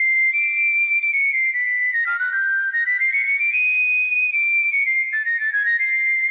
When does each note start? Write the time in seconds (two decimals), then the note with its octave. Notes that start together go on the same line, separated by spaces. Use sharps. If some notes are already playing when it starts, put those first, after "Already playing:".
Already playing: C7
0.33 D7
1.02 D7
1.13 C#7
1.33 C7
1.54 B6
1.93 A#6
2.07 F6
2.20 F#6
2.33 G6
2.73 A#6
2.86 B6
3.00 C7
3.13 C#7
3.27 C#7
3.39 D7
3.53 D#7
4.33 D7
4.73 C#7
4.86 C7
5.13 A6
5.26 A#6
5.40 A6
5.53 G#6
5.66 A#6
5.79 C7